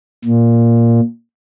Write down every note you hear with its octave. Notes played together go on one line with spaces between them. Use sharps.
A#2